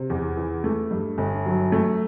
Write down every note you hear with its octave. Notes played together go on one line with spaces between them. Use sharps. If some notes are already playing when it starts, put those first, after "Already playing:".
Already playing: C3
E2
E3
A3
G2
G1
F#3
A3